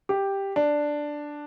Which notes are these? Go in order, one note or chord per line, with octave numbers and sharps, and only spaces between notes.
G4
D4